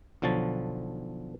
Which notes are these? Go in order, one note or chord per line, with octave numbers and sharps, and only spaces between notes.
B1 D3 F3 C#5 A5